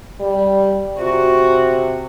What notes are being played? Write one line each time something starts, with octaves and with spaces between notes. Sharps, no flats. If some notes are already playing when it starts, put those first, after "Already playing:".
G3
C3 F#4